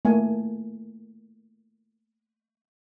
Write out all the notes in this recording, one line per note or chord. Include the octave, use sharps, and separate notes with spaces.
A3 A#3 G#5